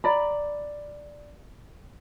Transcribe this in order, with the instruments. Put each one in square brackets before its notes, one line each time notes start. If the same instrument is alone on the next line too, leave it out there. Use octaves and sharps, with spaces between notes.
[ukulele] D5 A#5 B5